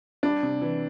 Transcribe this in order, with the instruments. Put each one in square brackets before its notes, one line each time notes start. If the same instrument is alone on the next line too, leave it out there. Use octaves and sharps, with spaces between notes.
[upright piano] G3 [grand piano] D4
[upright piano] C3
E3